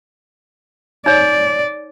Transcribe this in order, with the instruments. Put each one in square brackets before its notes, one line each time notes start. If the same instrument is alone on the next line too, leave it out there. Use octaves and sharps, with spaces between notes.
[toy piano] D#4 C#5 [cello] D5